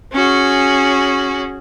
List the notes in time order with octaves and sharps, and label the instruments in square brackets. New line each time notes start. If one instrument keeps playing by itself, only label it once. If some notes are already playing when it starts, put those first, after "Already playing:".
[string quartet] C#4 F#4 G#4